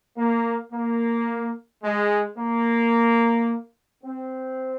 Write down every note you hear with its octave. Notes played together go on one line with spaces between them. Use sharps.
A#3
A#3
G#3
A#3
C4